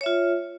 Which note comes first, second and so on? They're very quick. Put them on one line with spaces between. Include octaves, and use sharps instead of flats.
C#5 E5 F4